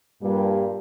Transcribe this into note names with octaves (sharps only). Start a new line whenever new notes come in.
G2 A#2 G3